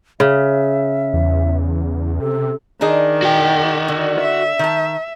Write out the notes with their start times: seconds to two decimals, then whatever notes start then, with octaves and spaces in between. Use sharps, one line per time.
0.20 C#3 E5
1.13 E2
2.20 C3 A4
2.81 D#3 D4 D#4 G#4
3.23 F#4 G5
3.88 D3
4.20 E5
4.59 D#3 A5